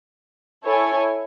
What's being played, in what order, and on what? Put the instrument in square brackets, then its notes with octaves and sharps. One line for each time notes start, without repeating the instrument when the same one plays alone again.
[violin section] E4 A4 C#5 G#5